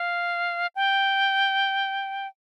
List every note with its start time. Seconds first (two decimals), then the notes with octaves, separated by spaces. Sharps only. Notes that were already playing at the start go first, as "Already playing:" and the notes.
Already playing: F5
0.76 G5